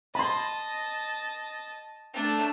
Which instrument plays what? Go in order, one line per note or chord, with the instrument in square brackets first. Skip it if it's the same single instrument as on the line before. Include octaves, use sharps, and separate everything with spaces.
[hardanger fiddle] D#5 A5 [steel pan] B5 C6
[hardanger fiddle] A3 D4